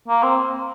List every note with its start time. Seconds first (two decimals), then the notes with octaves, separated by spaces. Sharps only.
0.08 A#3
0.23 C4